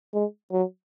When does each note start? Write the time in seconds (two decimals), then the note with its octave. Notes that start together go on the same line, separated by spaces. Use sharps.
0.14 G#3
0.52 F#3